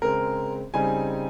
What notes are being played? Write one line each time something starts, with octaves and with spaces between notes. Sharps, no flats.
C#3 G#3 C4 A#4
C#3 G3 C4 D#4 G#5